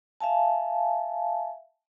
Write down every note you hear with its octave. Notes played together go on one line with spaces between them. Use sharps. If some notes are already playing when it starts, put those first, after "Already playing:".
E5 F5 G#5 A5